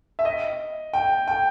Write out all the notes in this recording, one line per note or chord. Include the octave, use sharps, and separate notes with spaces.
E5
D#5
G5
G5